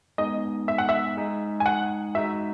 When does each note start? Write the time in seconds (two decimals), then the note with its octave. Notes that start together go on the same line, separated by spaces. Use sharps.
0.18 G#3 B3 D#4 G#4 D#5
0.68 E5
0.78 F#5
0.89 E5
1.17 G#3 D#4 G#4
1.60 G#5
1.66 F#5
2.15 G#3 D#4 F#4 E5